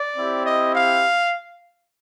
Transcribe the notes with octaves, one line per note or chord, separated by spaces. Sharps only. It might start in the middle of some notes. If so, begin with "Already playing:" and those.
Already playing: D5
C4 E4 G4
D#5
F5